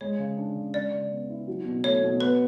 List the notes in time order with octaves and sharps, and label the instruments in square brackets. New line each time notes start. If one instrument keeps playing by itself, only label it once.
[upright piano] G#3 [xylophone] C#5
[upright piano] C#3
D4
C#3
[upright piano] G#3 [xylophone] D5
[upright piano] C#3
B3
E4
F#3
B2
[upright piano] A3 [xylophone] C#5
[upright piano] B2
[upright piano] B3 [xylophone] B4